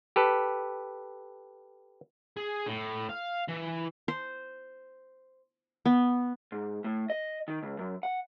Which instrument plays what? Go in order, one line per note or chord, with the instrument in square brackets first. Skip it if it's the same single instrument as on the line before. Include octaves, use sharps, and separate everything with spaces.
[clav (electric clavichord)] G4 A4 B4
[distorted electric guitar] G#4
A2
F5
E3
[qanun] C5
B3
[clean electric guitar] G#2
A2
D#5
D#3
C#2
F#2
F#5